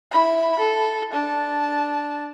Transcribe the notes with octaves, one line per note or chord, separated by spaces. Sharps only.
E4 B5
A4
D4 A5